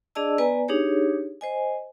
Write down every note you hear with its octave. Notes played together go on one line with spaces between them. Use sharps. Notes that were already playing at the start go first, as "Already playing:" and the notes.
D4 G#4 D5 D#5 A5 E6
B3 B4 D5 G#5 A#5
D4 D#4 G4 G#4 C#5
C5 D#5 G#5